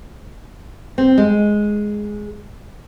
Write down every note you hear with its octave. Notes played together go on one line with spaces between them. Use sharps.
C4
G#3